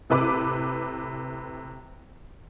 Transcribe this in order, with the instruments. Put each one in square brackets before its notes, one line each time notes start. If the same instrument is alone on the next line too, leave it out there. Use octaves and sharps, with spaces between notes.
[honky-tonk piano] A2 C3 B4 D6